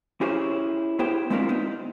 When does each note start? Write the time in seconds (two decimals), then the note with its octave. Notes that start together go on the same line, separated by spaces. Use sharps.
0.21 C#4 E4 G4 G#4 A#4 C5
0.99 B3 E4 G4 G#4 C5 G5
1.30 G#3 C4 D4 E4 F4 A#4
1.49 B3 D#4